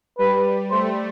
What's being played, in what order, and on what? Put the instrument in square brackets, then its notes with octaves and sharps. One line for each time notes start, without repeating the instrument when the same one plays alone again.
[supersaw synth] G3 [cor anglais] B4
[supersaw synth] A3 [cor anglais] C5